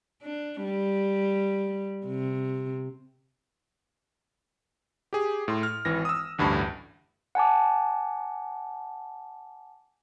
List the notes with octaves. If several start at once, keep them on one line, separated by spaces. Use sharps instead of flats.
D4
G3
C3
G4 G#4
A2 C6
F6
G#1 E3 A#6
D#6 E6
A1 D2 G2 A5 B5
F#5 G#5 A5 D6